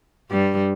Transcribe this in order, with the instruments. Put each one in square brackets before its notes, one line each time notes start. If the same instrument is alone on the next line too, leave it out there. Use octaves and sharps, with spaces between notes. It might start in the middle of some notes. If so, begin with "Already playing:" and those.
[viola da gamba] G2 G3